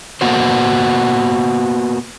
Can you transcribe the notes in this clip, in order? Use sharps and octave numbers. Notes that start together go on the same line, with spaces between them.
A#3 B3 F#4 C5